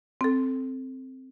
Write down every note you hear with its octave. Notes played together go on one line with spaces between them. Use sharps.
C4 A4